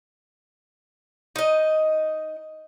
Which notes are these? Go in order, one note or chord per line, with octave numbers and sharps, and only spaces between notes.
D#4 D#5